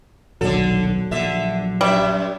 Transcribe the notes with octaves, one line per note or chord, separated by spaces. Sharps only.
D#1 B1 D3 F#3 A4
A#1 D3 E5
F#2 G3 E5